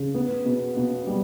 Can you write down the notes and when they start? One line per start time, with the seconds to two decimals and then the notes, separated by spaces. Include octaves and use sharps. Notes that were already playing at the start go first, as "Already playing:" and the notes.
Already playing: C#3
0.14 B3
0.45 B2
0.76 B2
1.07 G3